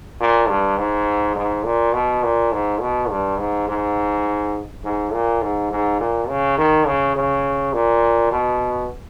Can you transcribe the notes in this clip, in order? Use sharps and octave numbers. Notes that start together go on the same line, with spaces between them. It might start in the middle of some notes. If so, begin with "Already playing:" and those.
A#2
G2
G#2
G#2
A#2
B2
A#2
G#2
B2
G2
G#2
G#2
G#2
A#2
G#2
G#2
A#2
C#3
D#3
C#3
C#3
A#2
B2